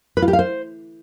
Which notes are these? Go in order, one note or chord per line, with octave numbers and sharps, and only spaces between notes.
B4
F4
G4
F5
C5